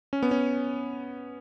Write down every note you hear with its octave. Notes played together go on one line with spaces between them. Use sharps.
C#4
B3
C#4